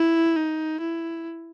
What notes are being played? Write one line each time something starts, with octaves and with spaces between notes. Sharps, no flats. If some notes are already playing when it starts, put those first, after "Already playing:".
Already playing: E4
D#4
E4